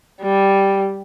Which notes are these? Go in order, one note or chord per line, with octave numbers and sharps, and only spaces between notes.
G3